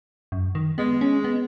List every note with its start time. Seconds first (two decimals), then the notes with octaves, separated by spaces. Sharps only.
0.32 F#2
0.55 D#3
0.78 G#3 B3
1.01 C#4
1.24 B3